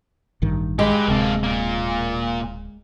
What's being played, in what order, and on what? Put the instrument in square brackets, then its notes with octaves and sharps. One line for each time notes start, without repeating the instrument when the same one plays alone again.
[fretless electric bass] A1 G2 D#3
[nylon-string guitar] G#3 [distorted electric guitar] G4 B4
[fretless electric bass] D1 C3 [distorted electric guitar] A#3 A4
[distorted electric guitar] A#2 A#3